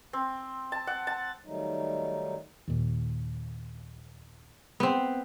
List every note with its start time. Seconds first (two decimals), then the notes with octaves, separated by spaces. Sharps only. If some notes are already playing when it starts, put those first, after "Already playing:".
0.13 C4
0.72 A5
0.87 F#5
1.07 A5
1.46 D#3 F#3 G3 A3 D#4
2.68 D#2 A#2
4.80 B3 C4